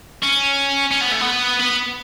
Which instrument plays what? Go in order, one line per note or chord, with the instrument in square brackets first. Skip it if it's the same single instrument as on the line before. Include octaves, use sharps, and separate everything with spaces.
[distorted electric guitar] C#4
C#4
B3
A3
B3
B3